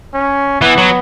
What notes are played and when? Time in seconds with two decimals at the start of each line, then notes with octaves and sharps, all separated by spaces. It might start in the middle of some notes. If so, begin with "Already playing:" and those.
0.14 C#4
0.61 E3 B3
0.78 F#3